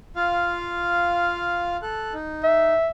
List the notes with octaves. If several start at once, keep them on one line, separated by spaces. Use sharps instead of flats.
F4 F5
A4 F#6
D#4
E5